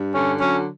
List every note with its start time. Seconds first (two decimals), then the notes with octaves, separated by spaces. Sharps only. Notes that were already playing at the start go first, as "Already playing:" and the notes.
Already playing: G2
0.13 D3 C#4
0.39 F#3 C#4